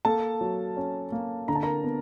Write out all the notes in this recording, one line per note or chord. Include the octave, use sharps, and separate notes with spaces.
A#3 A4 A5
F#3
C#4
A#3
D3 A#5
A5
A#4 A#5
B3